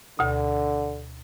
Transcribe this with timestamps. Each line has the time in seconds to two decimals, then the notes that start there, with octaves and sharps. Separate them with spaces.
0.19 D2 B2 D3